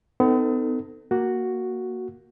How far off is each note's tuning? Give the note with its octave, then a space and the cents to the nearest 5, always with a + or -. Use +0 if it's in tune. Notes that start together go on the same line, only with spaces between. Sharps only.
B3 +45 D#4 -5 A4 +25
A#3 +0 F#4 +0